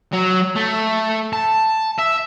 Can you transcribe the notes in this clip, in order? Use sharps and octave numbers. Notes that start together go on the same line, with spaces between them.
F#3
A3
A5
E5